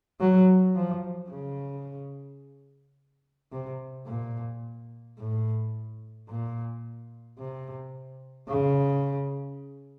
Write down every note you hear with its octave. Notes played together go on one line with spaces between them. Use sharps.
F#3
F3
C#3
C3
A#2
A2
A#2
C3
C#3